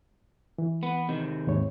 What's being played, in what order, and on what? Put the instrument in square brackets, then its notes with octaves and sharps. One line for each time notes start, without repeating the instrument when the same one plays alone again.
[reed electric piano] E3
[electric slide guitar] B3
C3 D#3
[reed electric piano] D#2 G#2 C#5